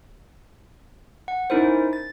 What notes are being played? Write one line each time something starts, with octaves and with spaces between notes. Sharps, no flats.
F#5
C#4 D#4 E4 A#4 C5
A6